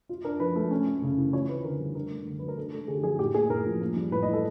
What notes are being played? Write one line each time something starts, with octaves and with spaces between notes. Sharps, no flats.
F4
D4 A#4
F3 B4
A3
C#4
A3
C#3
E3
F4 C#5
C4 B4
D3 A#4
G3
D4 A#4
A3
D3
F#3 B4
A#4
D4 A4
A3 A4
D3 G#4
G4
F#3 G#4
A2 G4
A#3 G#4
A2 A#4
F3
A#3
G3
A2 B4
D#5
E3
A4